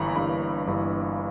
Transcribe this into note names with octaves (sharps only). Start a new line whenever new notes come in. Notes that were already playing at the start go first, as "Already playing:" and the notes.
Already playing: G1 G2 E3 A#3 A#5 B5
G1 G2 E3 A#3 B5
G1 G2 E3 A#3